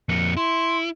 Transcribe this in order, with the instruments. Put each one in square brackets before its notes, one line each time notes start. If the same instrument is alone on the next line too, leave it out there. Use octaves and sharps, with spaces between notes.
[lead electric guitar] F2 A#3 [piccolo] C#7
[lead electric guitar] E4 [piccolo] C6